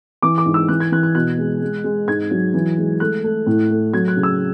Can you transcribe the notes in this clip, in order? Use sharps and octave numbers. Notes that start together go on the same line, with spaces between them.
E3 D6
D6
G#2
E6
E3 F#6
G#6
E3 F#6
F#6
B2 F#6
G#3
G#3
G#3
G#2 G#6
F#3
E3
G#3
A3 F#6
A3
A2
A3
F#3 G#6
F#6
C#3
E6